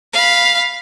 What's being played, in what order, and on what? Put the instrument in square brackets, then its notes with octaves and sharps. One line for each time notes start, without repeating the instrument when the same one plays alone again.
[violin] F5 B5